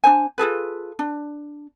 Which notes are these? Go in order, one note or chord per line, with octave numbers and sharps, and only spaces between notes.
D4 D#4 C5 G#5
F4 G#4 A4 B4
D4